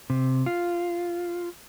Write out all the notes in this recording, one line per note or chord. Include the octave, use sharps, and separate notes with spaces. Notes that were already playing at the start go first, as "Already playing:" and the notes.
C3
F4